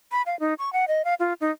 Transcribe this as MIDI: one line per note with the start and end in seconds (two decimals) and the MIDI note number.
0.12 0.22 83
0.26 0.38 77
0.40 0.54 63
0.59 0.72 85
0.73 0.85 78
0.88 1.02 75
1.05 1.14 77
1.20 1.33 65
1.41 1.51 63